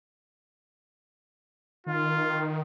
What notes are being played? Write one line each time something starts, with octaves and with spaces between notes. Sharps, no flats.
D#3 F4